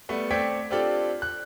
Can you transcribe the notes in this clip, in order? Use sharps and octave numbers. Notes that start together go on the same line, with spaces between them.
G3 A3 B3
A3 C4 D5 G5 G#6 B6
C4 D4 F4 G4 A4 D5
F#6